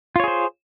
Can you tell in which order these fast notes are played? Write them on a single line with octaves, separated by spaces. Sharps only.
F4 C#5 G#4 C5